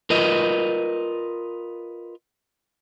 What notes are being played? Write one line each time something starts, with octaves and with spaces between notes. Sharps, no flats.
F4 A#4 B4 D#5